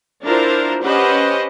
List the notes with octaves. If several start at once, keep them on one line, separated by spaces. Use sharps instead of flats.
D4 E4 F4 A#4 C5
C#4 G4 B4 C5 D#5 F#5